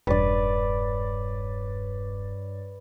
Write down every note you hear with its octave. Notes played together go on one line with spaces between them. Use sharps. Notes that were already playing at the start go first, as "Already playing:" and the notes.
E1 G2 B4 C#5 D5 A6